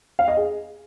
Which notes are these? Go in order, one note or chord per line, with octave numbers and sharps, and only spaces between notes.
F5
D#5
G#4